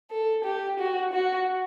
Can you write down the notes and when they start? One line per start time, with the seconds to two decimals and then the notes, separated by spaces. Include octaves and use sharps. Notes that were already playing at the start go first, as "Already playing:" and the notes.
0.11 A4
0.45 G4
0.79 F#4
1.13 F#4